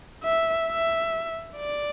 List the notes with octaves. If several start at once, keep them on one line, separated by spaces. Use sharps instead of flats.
E5
E5
D5